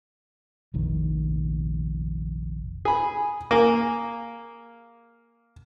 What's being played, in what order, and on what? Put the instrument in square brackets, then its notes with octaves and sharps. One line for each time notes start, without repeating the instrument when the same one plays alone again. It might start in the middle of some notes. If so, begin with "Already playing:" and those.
[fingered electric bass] F1 A#1 D#3
[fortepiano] G#4 B5
A#3 G#4